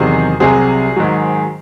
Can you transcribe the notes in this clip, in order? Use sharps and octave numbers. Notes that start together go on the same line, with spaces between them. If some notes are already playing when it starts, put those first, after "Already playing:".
Already playing: E2 C3 D#3 F#3 G#4 C5
C2 C3 F#3 G#4 C5
G#2 D#3 F#3